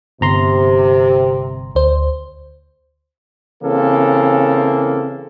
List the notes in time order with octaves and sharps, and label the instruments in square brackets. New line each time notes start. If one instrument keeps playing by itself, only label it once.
[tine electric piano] G1 A#5 C6 [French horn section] C3
[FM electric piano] D2 C5
[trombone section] C#3 E3 A#3 C4 A4